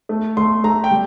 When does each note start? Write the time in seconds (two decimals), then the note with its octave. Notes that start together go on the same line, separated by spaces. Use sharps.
0.09 A3
0.37 A3 C6
0.64 A3 A#5
0.84 G5
0.91 G3